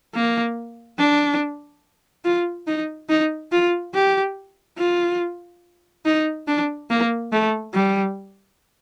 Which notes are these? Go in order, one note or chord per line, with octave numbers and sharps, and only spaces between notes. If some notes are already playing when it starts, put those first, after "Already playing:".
A#3
D4
F4
D#4
D#4
F4
G4
F4
D#4
D4
A#3
A3
G3